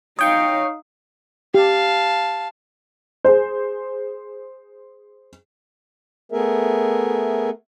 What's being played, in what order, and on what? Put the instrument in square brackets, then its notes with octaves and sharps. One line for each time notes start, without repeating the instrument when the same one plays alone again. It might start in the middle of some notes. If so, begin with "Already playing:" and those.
[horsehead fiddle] D#4 F5 [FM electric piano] C#5 G5 C#6 [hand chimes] D#6
[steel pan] G4 [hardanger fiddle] F5 A5
[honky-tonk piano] G#4 C5
[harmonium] A3 B3 G#4 A#4 E5